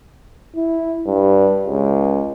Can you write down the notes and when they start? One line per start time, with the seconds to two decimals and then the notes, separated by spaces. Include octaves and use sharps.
0.56 E4
1.06 G2
1.67 C#2